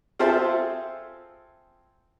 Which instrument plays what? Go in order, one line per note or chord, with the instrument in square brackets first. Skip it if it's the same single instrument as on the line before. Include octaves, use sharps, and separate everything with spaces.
[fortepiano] C4 F4 G#4 A4 C5 E5